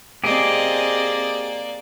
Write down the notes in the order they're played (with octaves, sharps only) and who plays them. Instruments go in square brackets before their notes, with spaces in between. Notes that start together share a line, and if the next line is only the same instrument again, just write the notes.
[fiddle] A#3 D5 [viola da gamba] C4 D#5 [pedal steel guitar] G4 G#4